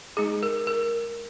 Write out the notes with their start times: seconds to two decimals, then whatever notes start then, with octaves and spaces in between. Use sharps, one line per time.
0.17 G#3 D#4 G#4
0.43 A#4
0.67 A#4